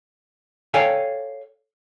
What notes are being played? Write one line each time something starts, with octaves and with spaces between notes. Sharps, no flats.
A4 C#5 D5 F5 G5 G#5